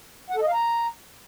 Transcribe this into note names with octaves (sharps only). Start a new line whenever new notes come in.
F#5
A4
D#5
F5
A#5